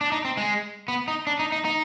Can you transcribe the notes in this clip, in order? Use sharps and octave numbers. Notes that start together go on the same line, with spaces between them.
D4
D#4
C4
G#3
B3
D#4
D4
D#4
D#4
D#4